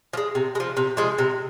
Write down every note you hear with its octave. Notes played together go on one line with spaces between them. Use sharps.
F3
G#3
C3
G#3
F3
C3
F3 G#3
C3